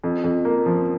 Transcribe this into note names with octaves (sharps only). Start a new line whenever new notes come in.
F2
F2
A#3
F3